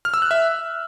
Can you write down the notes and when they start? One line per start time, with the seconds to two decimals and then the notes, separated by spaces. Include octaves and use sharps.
0.05 F6
0.14 E6
0.22 F#6
0.31 E5